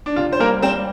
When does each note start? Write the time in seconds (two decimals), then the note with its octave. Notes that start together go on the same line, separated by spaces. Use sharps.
0.06 D4
0.16 C3 F4
0.33 C5
0.39 G3 A#3 A#4
0.62 G3 C4 C5